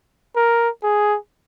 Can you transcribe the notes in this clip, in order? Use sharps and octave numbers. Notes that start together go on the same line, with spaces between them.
A#4
G#4